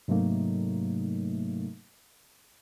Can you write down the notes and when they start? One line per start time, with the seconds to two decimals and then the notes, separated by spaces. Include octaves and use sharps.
0.08 G#2 C3 F#3 A3 A#3 D#4